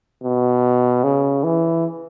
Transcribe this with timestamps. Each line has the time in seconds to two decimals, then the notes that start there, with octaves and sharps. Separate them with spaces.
0.24 B2
1.04 C#3
1.44 E3